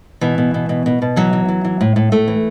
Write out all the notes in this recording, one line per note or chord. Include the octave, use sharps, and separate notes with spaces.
B2 E3
B2
B2
B2
B2
B2
E3 F#3
E3
E3
E3
A2
A2
A2 A3
E3